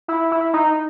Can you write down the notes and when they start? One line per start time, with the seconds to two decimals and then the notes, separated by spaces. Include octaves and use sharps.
0.08 E4
0.32 E4
0.54 D#4